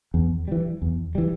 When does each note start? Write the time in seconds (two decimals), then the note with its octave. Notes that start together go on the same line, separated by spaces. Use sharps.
0.14 E2
0.48 E3 G3
0.82 E2
1.15 E3 G3